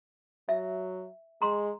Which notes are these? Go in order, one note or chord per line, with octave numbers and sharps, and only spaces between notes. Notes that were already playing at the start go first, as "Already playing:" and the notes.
F#3 E5
G#3 A#5 C6